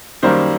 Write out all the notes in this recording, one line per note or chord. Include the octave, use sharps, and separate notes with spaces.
F#2 D#3 G3 A#3 C5